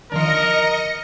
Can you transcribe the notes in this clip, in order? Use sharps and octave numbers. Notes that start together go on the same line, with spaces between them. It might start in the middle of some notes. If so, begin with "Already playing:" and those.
D3 D#3 F3 A#4 D#5 A#6 C#7